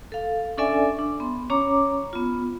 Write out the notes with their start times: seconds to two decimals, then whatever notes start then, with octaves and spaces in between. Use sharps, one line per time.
0.12 A4 F5
0.58 C#4 D4 A4 D5 E5 G#5
0.99 D4
1.20 B3 C6
1.50 C#4 C#5 A#5 D6
2.13 B3 F4